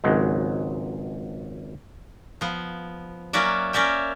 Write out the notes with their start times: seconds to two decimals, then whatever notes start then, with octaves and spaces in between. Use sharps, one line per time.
0.04 G#1 C#2 F#3 G#3
2.41 F3 B3
3.33 F#3 A#3 C#4 F#4 D5 E5
3.73 C#4 A#4 D5 E5 G5